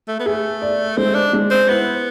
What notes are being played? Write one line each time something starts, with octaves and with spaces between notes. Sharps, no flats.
A3
B3
A3 G#4
D5
G#3 C4
D4
G#3
C4
B3 E4